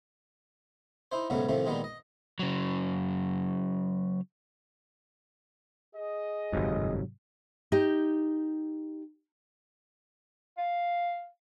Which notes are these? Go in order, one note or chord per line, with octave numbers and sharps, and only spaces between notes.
D#4 E4 C5
B1 G#2 C#3 F#3 A3 B3
A2 C3 D#3 F3 A3
A#2 D#3 G3 G#3 B3 D#4
D#5
C#3 F#3
G#4 D#5
G1 F2 G#2 C3 F#3
D#4 G4
F5